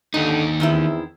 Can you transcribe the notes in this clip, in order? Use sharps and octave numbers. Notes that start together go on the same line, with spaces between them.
D#2 G#2 D3 D#4
E2 D#3 C4 E4